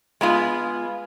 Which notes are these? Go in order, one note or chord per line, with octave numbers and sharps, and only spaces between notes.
G#3 B3 F4